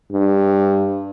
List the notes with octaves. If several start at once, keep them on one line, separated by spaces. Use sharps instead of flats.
G2